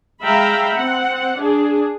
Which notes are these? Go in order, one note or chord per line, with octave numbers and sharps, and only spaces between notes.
G#3 E5 F5 G5 A#5 B5
C4 F#5
D4 G#4